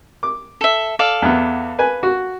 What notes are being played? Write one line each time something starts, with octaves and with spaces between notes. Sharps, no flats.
D6
A4 E5
A4 D5 F5
E2 B3
B4 G#5
F#4